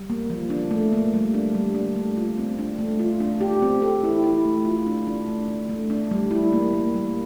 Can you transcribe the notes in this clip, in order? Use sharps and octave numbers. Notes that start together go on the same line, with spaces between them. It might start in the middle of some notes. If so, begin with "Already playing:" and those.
Already playing: G3
A#3
F3
D4
A3
A#3
G3
D4
G3
D4
A3
F4
C4
D4
A3
F4
D4
G4
C4
A4
E4
E4
A3
F4
D4
D4
A3
D4
A3
D4
G3
E4
A#3
A#3
G3